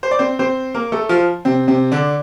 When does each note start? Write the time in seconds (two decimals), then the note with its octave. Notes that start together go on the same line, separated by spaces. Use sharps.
0.03 C5
0.11 D5
0.19 C4 C5
0.39 C4 C5
0.74 A#3 A#4
0.92 A3 A4
1.09 F3 F4
1.45 C3 C4
1.68 C3 C4
1.92 D3 D4